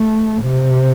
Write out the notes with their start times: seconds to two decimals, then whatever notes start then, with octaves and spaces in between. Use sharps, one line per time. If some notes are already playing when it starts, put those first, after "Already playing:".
Already playing: A3
0.43 C3